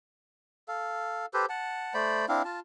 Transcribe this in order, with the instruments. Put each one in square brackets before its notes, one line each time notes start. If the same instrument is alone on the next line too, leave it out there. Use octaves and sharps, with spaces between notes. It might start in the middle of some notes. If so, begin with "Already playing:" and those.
[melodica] A4 F5
G4 A4 B4 C5
F#5 A5
A3 C5 D5 B5
C4 D4 E4 F5
F4 A5